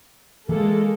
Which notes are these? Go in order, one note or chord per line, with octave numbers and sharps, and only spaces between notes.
E3 G#3 A#3 A4